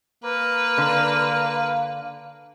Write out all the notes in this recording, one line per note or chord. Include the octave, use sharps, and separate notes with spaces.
A#3 B4
D3 F5